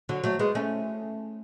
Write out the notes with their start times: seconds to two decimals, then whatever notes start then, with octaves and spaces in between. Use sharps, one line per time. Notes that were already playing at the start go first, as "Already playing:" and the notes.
0.09 D3 F#3
0.24 F#3 A3
0.39 G#3 B3
0.55 A3 C#4